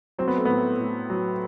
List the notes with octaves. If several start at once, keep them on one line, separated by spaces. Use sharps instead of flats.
F#3 C4
B3
A3
A2 B3
A2
F#3